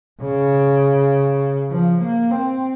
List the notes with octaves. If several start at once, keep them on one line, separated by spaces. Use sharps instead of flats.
C#3
F3
A#3
C4